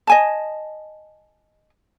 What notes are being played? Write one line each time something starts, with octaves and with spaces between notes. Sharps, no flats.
D#5 G#5 A5